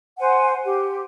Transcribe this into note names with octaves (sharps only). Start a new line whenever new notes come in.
C5 F#5 G#5
G4